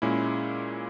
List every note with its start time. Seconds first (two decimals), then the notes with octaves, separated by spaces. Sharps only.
0.02 A#2 G#3 C#4 E4